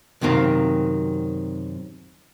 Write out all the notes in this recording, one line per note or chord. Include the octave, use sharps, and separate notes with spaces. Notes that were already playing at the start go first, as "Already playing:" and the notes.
F#2 C3 D#3 C4 F5